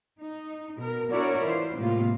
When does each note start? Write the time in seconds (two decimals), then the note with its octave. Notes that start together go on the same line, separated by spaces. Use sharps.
0.21 D#4
0.78 B2 A#4
1.12 D4 E4 F#4 A#4 C#5 D5
1.43 E3 F4 C5
1.78 A2 C3 G#3 A#3 F4